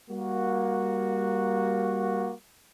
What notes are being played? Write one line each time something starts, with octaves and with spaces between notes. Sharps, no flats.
G3 A#3 F#4